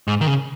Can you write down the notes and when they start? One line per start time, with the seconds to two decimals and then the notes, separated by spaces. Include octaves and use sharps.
0.08 G#2
0.21 D#3
0.27 C#3